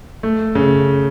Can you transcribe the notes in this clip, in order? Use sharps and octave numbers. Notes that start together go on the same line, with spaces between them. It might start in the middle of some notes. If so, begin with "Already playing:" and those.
A3
C#3